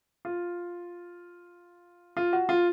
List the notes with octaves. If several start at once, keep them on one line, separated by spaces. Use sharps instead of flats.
F4
F4
F#4
F4